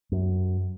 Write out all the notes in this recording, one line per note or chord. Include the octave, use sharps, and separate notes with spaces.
F#2